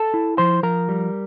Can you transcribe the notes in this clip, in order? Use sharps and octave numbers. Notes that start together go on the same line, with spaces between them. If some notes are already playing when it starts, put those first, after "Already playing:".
Already playing: A4 A5
E4
F3 C5 C6
F3 A#4 A#5
G3